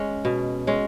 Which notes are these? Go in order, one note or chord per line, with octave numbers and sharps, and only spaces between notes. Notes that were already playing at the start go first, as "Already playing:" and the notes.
Already playing: G#3 C#4
B2
G#3 C#4